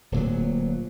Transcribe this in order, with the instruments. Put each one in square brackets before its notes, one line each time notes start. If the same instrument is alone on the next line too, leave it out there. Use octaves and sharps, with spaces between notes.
[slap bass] D1 A#2 F#3